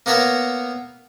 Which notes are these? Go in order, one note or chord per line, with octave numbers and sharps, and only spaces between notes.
A#3 B3 A#4 C#5 E5